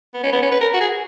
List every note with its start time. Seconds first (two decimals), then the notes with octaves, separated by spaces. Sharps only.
0.14 B3
0.23 C#4
0.32 B3
0.42 C#4
0.51 B4
0.61 A#4
0.74 F#4
0.80 G#4